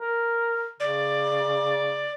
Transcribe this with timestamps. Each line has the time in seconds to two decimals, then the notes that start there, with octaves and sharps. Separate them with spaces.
0.01 A#4
0.80 C#3 D5